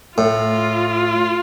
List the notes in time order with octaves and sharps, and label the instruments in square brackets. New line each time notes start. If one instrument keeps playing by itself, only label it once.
[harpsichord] A2 [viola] F4